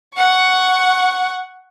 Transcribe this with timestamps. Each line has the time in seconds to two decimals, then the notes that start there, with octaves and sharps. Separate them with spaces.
0.17 F#5 C#6